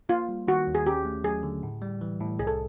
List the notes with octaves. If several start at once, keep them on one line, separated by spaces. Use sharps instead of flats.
A#3 F4
G3
D#3 F#4
D#2
G#4
C#4 G4
A3
F#3 G#4
D3
A2
G3
E3
A2
C2 G#4
A4